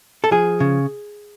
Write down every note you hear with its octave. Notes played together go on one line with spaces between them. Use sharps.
A4
F3 G#4
C#3